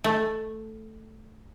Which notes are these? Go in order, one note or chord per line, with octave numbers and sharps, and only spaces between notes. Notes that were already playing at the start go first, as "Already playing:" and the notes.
A3